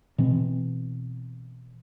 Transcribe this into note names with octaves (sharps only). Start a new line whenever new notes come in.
B2 E3 C4